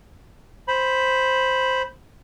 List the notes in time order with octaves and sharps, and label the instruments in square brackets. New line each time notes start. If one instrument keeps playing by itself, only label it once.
[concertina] C5 B5